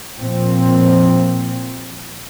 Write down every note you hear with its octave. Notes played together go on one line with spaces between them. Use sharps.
A#2 F3 C4